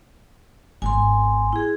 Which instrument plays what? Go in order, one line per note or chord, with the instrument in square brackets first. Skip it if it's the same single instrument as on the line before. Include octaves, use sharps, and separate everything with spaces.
[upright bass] G#1 B3 [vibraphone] G#5 C6
[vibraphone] E4 G#4